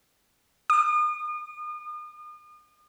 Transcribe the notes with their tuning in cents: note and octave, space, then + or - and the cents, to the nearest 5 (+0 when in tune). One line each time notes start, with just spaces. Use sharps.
D#6 -40